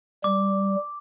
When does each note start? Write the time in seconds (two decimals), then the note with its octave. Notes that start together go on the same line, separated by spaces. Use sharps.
0.24 G3 D6